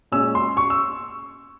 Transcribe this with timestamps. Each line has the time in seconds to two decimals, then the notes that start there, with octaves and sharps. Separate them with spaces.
0.12 A#2 G#3 C#4 E6
0.35 C6
0.57 C#6
0.70 E6